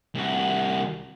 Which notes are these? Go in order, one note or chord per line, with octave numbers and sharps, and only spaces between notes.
C2 F#4